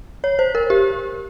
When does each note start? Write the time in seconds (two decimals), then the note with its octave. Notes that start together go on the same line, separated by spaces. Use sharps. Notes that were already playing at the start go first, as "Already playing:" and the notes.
0.24 C#5
0.39 C5
0.55 A#4
0.70 G4